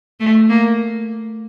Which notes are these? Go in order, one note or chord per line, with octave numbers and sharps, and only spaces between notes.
A3
A#3